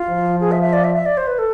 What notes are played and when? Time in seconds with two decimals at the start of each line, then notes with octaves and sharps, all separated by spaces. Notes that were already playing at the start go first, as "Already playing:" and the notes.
Already playing: F4
0.09 F3
0.41 G#4
0.52 E5
0.62 E5
0.73 D5
0.84 E5
0.95 E5
1.06 D5
1.17 C5
1.27 B4
1.39 A4